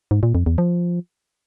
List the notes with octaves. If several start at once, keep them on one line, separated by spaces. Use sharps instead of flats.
G#2
A#2
F2
E2
F3